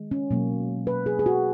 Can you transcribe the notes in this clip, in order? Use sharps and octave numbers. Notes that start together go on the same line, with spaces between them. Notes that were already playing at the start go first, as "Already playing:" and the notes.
Already playing: D#3 G#3
C#4
B2 F#3 A#3
B4
G#4
G#4
F#4